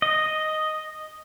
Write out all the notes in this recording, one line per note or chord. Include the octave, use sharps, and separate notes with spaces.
D#5